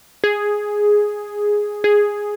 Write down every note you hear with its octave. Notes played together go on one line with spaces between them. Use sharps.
G#4
G#4